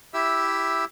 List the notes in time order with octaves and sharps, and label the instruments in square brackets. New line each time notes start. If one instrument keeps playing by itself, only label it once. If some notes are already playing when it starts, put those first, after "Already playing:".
[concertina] E4 G4 E5 E6